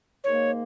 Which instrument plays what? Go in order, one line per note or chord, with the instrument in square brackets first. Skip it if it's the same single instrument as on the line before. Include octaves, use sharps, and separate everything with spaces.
[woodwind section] G#2 D#3 A#3 [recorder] C#5